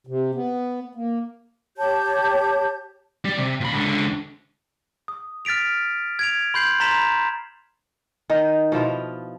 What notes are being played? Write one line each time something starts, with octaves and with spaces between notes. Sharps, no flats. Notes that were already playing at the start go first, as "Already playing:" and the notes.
C3
B3
A#3
G4 C#5 A5 G6
G3
C3
A#2 B5
C#2 D3
D#6
F6 A6 B6 D7 F7
G#6 D7 F7
B5 C6 G6 C7 F#7
A#5 C6 A6 B6 E7 F7
B5
D#3 D#4 D#5
B2 F3 E4 F4